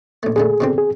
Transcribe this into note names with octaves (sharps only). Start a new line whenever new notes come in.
A#1 A3
A#2 D3 A3 G#4
B2 D3 C4
G#4